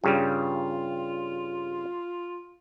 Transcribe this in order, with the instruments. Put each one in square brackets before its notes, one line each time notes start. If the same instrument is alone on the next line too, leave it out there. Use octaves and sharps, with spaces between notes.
[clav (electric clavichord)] G2 C#3 G3 [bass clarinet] F4